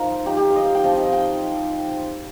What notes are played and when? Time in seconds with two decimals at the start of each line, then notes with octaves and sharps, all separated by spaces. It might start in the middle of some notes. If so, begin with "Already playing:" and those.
Already playing: F3 D#4 A#4 C5
0.26 F3 D#4 G4
0.37 G4
0.50 F5
0.56 D#5
0.65 F5
0.75 G5
0.84 F3 C4 D#4 D#5
0.97 D#5
1.13 G5